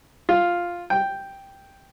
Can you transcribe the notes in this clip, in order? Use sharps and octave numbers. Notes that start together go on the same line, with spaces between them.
F4
G5